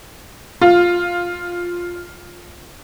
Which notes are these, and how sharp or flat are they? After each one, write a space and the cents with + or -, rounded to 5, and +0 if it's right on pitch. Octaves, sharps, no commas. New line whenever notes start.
F4 +5